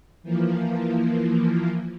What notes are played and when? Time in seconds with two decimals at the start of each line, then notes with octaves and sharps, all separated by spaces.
0.23 E3 F3 A#3